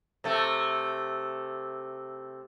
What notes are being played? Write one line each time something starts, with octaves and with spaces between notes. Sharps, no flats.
C3 A3